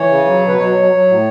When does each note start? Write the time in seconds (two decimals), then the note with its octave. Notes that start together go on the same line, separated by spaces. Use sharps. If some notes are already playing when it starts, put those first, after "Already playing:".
Already playing: E3 C#5
0.09 C#3
0.25 F#3
0.41 B2
0.48 B4
0.58 F#3 C#5
0.75 F#3
0.92 F#3
1.08 A2